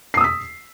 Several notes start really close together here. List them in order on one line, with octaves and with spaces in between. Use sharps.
C7 D#6 E6 B6